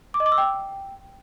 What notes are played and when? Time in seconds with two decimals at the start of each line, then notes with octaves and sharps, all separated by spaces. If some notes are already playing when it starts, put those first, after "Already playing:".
0.14 D6
0.20 D#5
0.26 D6
0.32 E6
0.38 G5